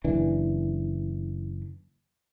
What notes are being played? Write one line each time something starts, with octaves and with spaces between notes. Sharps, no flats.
F#1 E3 D4